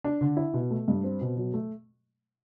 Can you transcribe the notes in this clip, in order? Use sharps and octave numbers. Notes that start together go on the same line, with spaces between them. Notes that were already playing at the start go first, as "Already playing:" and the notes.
D4
D3
E4
B2
A3
G2
C4
B2
F#3
A3